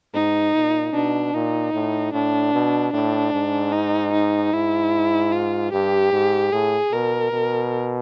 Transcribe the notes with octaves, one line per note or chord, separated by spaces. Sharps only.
G#2 D#4
A#2
B2 D4
A#2 D#4
A2
A2 D4
B2
A2 D4
G#2
D#4
D#4
G#2 E4
F4
G2 G4
G#2
A2 G#4
B2 A#4
B2